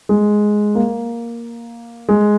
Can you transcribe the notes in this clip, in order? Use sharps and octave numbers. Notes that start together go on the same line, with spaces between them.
G#3
A#3
G#3